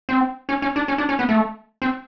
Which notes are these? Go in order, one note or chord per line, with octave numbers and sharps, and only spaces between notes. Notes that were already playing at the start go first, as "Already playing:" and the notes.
C4
C#4
C#4
D4
C#4
D4
C#4
B3
A3
C4